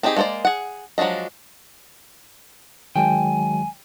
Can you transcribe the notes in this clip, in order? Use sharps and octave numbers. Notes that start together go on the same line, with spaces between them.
C4 D4 D#4 G4 G#4
G#3 A#3 A4 C5 D5
G#4 F#5
F3 F#3 G#3 D4 D#5
D#3 F#3 G#3 G5 G#5